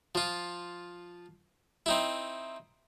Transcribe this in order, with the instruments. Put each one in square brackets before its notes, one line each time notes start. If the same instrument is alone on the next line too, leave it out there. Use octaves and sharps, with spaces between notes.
[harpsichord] F3 F4
C4 D#4 E4